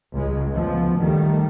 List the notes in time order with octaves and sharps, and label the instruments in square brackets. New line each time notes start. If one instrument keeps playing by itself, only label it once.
[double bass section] C#2 C#3 G#3
D2 F3 B3
D#3 G3 A3